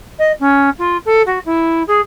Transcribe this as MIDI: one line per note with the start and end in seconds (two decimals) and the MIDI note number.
0.18 0.32 75
0.39 0.69 61
0.78 0.97 65
1.05 1.22 69
1.26 1.38 66
1.45 1.82 64
1.87 2.00 68